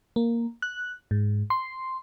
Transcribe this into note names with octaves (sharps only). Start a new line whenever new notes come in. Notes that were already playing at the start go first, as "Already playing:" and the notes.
A#3
F#6
G#2
C6